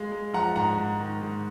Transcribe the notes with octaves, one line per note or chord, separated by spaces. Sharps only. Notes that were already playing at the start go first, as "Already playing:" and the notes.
Already playing: G#3 F5
G#3
F3 F#5 A#5
G#2 F#5 A#5
G#2
D#3
G#2